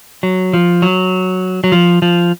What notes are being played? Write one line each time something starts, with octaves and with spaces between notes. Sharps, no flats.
F#3
F3
F#3
F#3
F3
F3